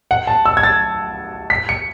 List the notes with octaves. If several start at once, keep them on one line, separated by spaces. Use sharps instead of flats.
F#5
A5
E6
G#6
A6
B6
C#7